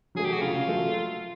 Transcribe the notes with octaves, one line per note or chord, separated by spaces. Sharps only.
F#3 A3 G#4
G4
F#4
C#3 F4
F#3 A3